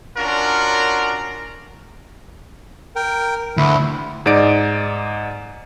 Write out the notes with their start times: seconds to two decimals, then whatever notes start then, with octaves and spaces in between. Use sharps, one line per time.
0.17 C#4 D4 F4 F#4 A#4
2.96 A#4 G5
3.57 D2 E4
4.26 G#2 D#4 D5 D7